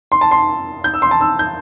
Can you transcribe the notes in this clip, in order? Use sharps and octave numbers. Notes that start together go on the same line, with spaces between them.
C6
A5
C6
G6
E6
C6
A5
E6
G6